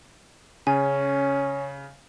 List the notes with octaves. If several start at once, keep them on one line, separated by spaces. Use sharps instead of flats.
C#3 C#4 G#5